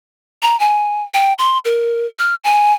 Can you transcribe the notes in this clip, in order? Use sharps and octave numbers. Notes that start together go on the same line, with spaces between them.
A#5
G#5
G5
C6
A#4
F6
G#5